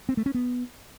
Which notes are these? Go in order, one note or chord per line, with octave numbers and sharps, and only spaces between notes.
C4
A3
C#4
B3